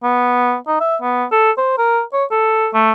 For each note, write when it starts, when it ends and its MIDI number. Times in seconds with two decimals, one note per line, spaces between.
0.04 0.56 59
0.67 0.80 63
0.80 0.96 76
1.02 1.25 59
1.32 1.51 69
1.58 1.74 72
1.78 2.02 70
2.13 2.25 73
2.31 2.68 69
2.74 2.93 57